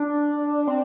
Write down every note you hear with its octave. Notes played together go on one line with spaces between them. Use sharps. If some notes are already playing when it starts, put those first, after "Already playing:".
Already playing: D4
C4